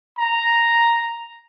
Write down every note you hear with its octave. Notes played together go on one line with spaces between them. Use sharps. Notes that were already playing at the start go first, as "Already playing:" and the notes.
A#5